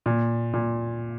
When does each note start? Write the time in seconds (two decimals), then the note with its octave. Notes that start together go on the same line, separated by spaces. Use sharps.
0.06 A#2
0.53 A#2